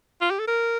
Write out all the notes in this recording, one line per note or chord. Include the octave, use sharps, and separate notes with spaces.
F4
G4
A4
A#4